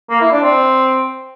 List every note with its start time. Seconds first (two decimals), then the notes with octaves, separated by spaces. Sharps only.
0.10 A#3
0.21 E4
0.31 D4
0.42 C4